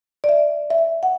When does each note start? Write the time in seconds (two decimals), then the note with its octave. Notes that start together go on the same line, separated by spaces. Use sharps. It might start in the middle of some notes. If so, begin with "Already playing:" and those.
0.24 D5
0.29 E5
0.70 E5
1.03 F#5